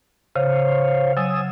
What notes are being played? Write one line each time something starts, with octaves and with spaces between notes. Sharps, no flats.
C#3 C5 C#5 F5
F#3 G#5 D#6 E6